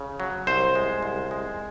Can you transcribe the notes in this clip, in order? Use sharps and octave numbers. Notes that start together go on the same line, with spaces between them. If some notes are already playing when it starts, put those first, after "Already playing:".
Already playing: C#3
F#3
C2 C5
G#3
C2
G#3